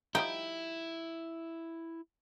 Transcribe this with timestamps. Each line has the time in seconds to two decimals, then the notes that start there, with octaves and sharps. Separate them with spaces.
0.15 F3 G3 D#4 E4 G5